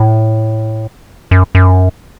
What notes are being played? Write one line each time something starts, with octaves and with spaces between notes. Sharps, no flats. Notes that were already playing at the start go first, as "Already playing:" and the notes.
Already playing: A2
F#2
F#2